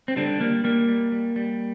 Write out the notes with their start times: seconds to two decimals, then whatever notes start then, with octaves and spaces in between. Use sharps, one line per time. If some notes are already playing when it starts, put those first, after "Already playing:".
0.08 C4
0.16 D3 G3 D4
0.41 G3 A#3
0.64 G3 A#3
0.88 G3
1.12 G3
1.36 G3